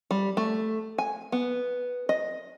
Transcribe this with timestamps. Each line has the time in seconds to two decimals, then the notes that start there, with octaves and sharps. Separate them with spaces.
0.11 G3
0.37 A3
0.98 G#5
1.32 B3
2.09 D#5